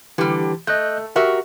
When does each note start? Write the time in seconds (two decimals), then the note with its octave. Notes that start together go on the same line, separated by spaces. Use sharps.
0.18 D3 E3 G3 G4
0.67 A3 D#5 F#6 G6
1.16 F#4 G4 A#4 E5